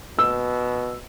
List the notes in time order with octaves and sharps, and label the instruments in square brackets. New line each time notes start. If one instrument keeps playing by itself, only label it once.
[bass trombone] B2 [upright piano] E6